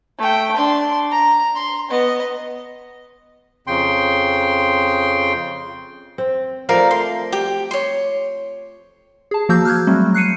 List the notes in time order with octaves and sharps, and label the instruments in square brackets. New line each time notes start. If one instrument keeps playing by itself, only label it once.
[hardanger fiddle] A3 G5
D4 C6
A#5
C6
B3 D#5
[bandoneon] F2 C#3 G5 C6
[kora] C4
[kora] F3 A3 [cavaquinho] A#4 D5 F5
[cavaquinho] C6
G4
C#5 C6
[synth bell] G#4 A5
F3 A#3 F#4 E6 G6
F6 F#6 G#6
F#3 G3 A3 C4
F#6 C7 C#7 D#7